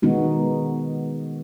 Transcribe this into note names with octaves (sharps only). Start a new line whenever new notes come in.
D#3 G#3 B3 D#4 F#4